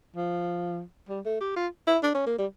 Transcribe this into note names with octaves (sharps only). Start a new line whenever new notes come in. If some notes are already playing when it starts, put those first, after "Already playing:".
F3
G3
A3
G4
F4
E4
D4
C#4
A#3
G3